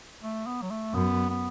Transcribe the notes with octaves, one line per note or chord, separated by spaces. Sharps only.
A3
B3
F#3
A3
F#2 B3
B3